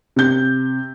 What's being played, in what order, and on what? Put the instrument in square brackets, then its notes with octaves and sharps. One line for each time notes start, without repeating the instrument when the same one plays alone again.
[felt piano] C3 G6